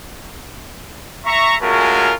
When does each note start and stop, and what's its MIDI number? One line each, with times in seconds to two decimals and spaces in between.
1.25 1.55 76
1.25 1.55 82
1.25 1.55 85
1.62 2.13 56
1.62 2.13 57
1.62 2.13 61
1.62 2.13 65
1.62 2.13 66
1.62 2.13 70